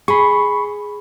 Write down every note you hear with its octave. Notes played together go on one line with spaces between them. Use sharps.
G#4 B5 C#6